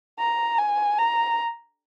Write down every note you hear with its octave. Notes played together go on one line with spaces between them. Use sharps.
A#5
G#5
A#5